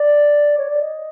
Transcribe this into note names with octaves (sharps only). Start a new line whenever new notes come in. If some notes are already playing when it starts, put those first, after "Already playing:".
Already playing: D5
C#5
D5
D#5